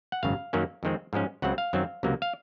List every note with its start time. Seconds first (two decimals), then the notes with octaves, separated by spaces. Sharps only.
0.12 F#5
0.23 G#1 F#2 C#3 F5
0.53 F#2 D#3 F#3 A#3 C#4
0.83 F2 D#3 G#3 C4
1.13 G#2 F3 G#3 C#4
1.42 C#2 C#3 F#3 C4 F#5
1.58 F5
1.73 F#2 D#3 F#3 C4
2.03 C#2 C3 F#3 A#3
2.22 F5